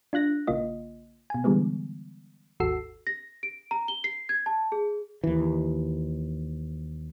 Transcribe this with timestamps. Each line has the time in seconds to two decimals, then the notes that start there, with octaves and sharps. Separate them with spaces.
0.13 D4 F4 F#6 A#6
0.47 A#1 C#3 A#3 F4 D#5
1.30 B2 G#5
1.44 D3 E3 G3 G#3 B3
2.60 G#1 D#2 F#4 A4 E6 C7
3.07 A#6
3.43 D7
3.71 A#5
3.88 G7
4.04 C7
4.29 G#6
4.46 A5
4.72 G#4
5.24 D#2 E3